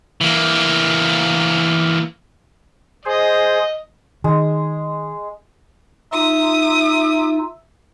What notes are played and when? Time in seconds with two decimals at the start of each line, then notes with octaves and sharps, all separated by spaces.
0.21 E3 A#3
3.05 G#4 C5 D#5
4.24 D#3 G#3
6.13 D#4 F4 E5 D#6